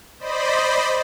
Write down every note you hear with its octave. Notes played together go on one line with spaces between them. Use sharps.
C5 D5 D#5 B5